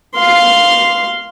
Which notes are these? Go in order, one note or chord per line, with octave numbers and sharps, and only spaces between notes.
F5 C6